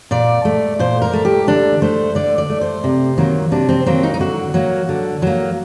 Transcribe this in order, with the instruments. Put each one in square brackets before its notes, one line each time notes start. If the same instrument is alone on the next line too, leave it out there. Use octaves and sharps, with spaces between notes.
[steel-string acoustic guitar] A#2 D5
A3
A#2 C5
A#4
A3
G4
D3 D4
A3 C5
D3 D5
D5
A3
C5
C3
D#3 F#3 A#3
C3 D4
C4
D#3 F#3 A#3 C4
D#4
D#4
D3 F#4
F#3 A#3
D3
F#3 A#3